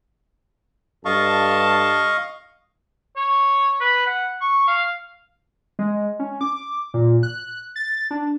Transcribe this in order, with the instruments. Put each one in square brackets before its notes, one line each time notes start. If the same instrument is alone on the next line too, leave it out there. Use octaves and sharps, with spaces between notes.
[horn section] G2 A4 A5 [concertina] D#5 F5 C#6
[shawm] C#5
B4
F#5
C#6
F5
[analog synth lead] G#3
C#4
D6
A#2
F#6
A6
D4